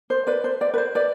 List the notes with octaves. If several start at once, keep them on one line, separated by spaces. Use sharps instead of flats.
C5
B4 D5
C5
B4 D5
B4
C5
B4 D5